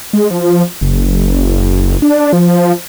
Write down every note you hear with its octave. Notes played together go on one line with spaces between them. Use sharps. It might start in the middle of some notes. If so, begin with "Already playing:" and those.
G#3
F3
F#1
D4
F3